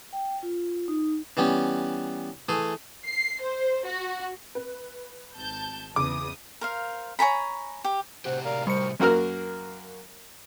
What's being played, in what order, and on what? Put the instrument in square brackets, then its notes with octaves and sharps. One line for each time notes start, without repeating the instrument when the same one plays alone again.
[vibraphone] G5
F4
D#4
[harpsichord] E3 G3 B3 C#4
E3 A3 G#4
[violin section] C7
C5
F#4
[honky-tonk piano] B4
[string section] G#1 A5 G6
[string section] E2 D#6 [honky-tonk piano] C#3 [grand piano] D6
[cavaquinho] A#4 C5 F5
C#5 G#5 A#5 B5
G4
[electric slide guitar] A2 C3 G4 [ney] C5 [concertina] F#5
[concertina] A#4 F5 [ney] D5
[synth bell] G3 C#7 [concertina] A#4 C#6 [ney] C5
[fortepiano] F#2 A#3 F#4 A#4 F6